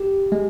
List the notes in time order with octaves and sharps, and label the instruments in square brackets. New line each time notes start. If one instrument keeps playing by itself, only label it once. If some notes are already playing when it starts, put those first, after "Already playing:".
Already playing: [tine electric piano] G4
G#3